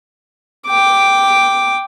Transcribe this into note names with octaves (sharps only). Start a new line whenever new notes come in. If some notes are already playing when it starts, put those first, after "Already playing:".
G5 D6